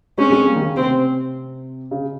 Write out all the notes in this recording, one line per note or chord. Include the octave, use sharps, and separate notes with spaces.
G#3 C4 C#4
G#3 C4
G3 A#3
D#3
C#3
C3 C4
C#3